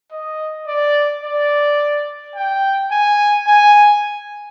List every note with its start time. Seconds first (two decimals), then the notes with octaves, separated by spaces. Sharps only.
0.12 D#5
0.67 D5
1.24 D5
2.36 G5
2.92 G#5
3.47 G#5